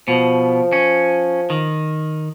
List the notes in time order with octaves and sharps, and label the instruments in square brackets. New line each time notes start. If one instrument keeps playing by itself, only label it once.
[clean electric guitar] B2 [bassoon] F3
[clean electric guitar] C#4
D#3